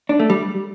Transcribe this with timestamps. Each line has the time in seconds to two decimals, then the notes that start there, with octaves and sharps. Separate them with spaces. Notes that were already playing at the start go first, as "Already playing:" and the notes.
0.09 D4
0.20 A3
0.30 G3